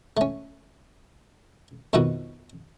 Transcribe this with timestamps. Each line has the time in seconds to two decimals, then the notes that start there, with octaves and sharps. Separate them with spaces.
0.17 A3 C#4
1.93 F2 B2 D#3 B3 F#4